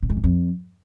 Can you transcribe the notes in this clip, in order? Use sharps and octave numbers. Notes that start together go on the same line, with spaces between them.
B2
G#2
E2
F2